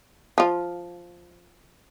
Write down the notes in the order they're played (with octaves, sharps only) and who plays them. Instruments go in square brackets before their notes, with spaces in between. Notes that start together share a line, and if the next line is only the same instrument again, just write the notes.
[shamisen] F3 F4